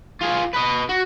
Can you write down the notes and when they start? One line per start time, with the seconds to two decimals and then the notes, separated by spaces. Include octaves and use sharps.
0.21 F4 G#4
0.53 B4 D#5
0.89 F#4